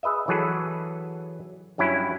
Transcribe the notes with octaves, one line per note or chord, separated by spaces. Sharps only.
G#4 B4 D#5 E5
E3 F#3 G#4 A4 B4
G2 F#3 C#4 E4